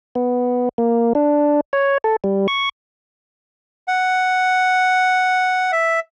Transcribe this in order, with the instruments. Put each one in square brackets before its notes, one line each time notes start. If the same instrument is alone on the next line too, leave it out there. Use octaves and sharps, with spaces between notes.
[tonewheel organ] B3
A#3
D4
C#5
A4
G3
C#6
[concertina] F#5
E5